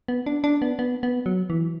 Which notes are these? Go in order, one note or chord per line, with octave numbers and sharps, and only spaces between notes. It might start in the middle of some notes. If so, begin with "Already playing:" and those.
B3
D4
D4
B3
B3
B3
F#3
E3